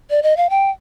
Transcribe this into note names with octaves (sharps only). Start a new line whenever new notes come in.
D5
D#5
F5
G5